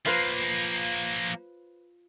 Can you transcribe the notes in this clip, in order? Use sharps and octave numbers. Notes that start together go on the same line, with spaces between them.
F3 A#3 F4 B4 C5